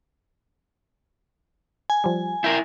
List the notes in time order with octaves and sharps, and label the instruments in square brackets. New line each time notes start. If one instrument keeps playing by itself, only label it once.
[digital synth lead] G#5
[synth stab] F3 G3
[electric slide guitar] E4 A#4 [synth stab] G5